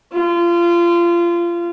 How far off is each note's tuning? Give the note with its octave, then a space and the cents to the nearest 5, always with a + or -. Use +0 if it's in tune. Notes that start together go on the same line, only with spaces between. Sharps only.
F4 -25